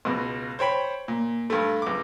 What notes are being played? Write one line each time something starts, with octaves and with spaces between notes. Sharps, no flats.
C#2 B2
C5 C#5 G5 B5
A#2
G2 A3
C#2 D6